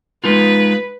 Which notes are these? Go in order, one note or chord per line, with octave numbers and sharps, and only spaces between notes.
G#3 D#4 F4 B4